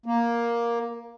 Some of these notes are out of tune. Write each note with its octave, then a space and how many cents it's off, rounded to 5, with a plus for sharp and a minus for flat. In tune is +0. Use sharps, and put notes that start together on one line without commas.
A#3 +10